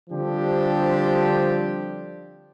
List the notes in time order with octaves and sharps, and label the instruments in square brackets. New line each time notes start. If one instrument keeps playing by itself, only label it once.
[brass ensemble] D3 F3 G3 C4 D4 G4